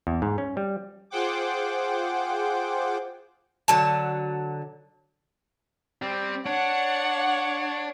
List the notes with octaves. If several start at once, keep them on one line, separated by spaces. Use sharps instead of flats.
E2
G#2
C#4
G3
F4 G#4 C5 F#5 G5 D6
D3 F#3 A5
G3 C4
D4 C#5 F#5